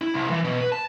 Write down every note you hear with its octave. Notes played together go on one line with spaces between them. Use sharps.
E4
C2
E3
B2
B4
A5